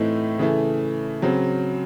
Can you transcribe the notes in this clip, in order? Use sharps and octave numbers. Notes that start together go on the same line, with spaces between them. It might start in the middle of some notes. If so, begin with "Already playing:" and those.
Already playing: A2 E3 A3 C4 D#4
C#3 E3 A3
C#3 F#3 C4